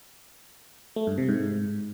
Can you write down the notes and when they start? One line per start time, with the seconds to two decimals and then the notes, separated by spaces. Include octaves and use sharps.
0.96 A3
1.07 G2
1.18 C3
1.29 G#2